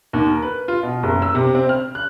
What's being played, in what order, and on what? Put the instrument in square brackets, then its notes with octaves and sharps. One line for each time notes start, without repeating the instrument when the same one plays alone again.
[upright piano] D#2
A#4
B4
F4
B2
F#1
E6
C3
C4
F6
F#6